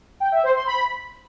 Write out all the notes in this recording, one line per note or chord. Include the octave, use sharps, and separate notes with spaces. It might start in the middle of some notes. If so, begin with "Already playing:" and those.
G5
E5
C5
C6
B5